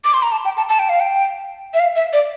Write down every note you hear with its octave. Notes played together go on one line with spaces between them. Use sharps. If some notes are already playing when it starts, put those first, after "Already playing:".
D6
C6
A#5
A5
G5
A5
A5
G5
F5
G5
E5
F5
E5
D5